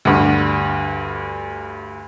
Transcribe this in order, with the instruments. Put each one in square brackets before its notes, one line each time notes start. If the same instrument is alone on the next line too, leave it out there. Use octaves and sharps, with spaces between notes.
[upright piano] D2 G2